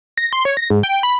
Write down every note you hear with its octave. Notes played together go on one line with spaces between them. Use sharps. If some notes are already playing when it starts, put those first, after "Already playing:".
A#6
C6
C#5
A#6
G#2
G5
B5